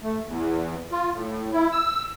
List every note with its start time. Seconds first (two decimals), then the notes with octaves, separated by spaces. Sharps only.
0.01 A3
0.27 E2
0.91 F4
1.14 A2
1.53 E4
1.72 E6